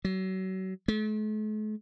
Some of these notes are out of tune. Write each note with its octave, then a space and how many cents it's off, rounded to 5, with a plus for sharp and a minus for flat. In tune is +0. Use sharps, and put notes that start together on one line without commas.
F#3 +30
A3 -45